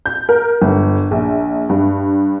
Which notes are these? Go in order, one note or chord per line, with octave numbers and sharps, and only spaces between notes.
G6
A#4
G1
A#1
G2